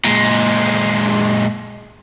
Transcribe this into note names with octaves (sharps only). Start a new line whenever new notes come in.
A#2 G#3